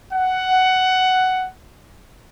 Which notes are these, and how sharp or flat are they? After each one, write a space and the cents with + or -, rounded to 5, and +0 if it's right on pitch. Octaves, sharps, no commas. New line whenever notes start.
F#5 +10